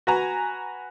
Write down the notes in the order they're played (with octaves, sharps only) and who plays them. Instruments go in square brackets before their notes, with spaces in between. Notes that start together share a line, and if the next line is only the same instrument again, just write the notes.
[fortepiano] F#4 B4 G#5 A#5